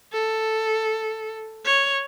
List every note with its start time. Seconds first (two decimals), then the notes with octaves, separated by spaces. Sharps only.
0.13 A4
1.65 C#5